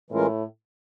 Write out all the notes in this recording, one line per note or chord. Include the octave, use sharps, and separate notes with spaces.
A2 E3 G#3 C#4 F4 A#4